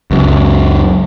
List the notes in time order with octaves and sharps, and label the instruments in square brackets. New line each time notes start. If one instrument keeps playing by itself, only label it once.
[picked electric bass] C#2 F#2